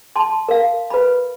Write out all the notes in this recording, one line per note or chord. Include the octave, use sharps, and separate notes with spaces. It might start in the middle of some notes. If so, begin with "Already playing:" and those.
A5 C6
A#4 F5
B4 B5